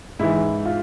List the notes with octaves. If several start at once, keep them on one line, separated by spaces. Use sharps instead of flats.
G#2 E3 E4
F4